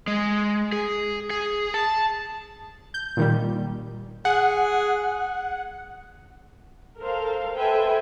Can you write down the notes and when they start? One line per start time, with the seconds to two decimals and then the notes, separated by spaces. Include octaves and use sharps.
0.07 G#3
0.72 G#4
1.30 G#4
1.74 A5
2.94 G6
3.17 A#2 D#3 G3
4.25 G#4 F#5
6.99 A4 A#4 C5 F5
7.56 A4 B4 C5 E5 G5 G#5